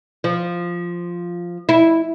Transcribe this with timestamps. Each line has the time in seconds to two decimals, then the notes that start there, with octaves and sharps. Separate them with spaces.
0.24 F3
1.69 E4